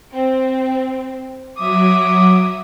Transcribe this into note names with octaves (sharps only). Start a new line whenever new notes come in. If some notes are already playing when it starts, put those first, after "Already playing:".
C4
F#3 E5 D6 D#6